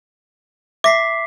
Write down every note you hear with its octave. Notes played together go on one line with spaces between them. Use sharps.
E5 D6 B6 C7